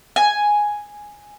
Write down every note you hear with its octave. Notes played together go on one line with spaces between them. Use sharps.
G#5